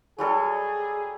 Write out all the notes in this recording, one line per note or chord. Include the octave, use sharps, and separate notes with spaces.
F#3 G3 G#4 A4